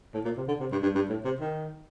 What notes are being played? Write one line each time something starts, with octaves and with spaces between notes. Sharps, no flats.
A2
A#2
C3
D3
C3
G2
G2
G2
A2
C3
D#3